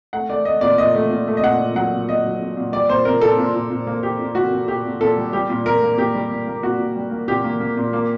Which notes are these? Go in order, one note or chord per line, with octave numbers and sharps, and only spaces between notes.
A3 F#5
A3 D5
A3 D#5
A#2 D5
A#2 D#5
A3
A#2
A3
D#5
A#2 F#5
A#2
F#3 F#5
A#2
A#2 D#5
F#3
A#2
A#2
G3 D5
A#2 C5
A#2 A#4
A#2 A4
A#2
A#2
A#2
A#3
A#2 G4
A#2
A#3 F#4
A#2
A#2 G4
A#2
A#2 A4
G3
G3 G4
A#2
A#2 A#4
A#3
A#2 G4
G3
A#2
A#3
A#2 F#4
A#2
G3
A#3
A#2 G4
A#3
A#3
A#2
A#3